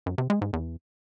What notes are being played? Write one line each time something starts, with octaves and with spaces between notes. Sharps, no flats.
F#2
C3
G#3
G#2
E2